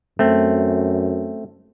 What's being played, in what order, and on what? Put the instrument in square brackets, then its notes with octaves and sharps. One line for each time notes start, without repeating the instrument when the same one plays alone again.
[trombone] F#2 [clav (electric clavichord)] A3 C4